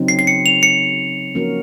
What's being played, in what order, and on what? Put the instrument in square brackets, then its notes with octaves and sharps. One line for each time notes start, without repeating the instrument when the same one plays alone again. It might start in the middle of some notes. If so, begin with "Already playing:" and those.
Already playing: [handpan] C#3 F#3 C4 D#4
[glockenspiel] C7
C7
C#7
F7
C#7
[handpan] F3 A#3 C#4 F#4 A#4